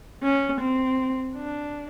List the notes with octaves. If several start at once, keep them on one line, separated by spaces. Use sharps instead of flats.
C#4
C4
D4